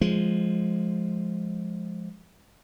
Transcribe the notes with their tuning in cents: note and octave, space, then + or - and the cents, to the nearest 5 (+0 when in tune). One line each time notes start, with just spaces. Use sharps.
F3 +0 G#3 +0